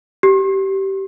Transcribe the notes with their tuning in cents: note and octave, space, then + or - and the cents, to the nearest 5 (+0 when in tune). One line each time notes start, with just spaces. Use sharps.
G4 -20